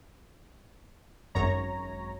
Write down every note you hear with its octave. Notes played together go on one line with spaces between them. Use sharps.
G#1 F#2 C#5 A#5